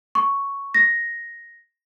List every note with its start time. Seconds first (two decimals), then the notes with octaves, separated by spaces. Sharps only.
0.15 C#6
0.74 A#6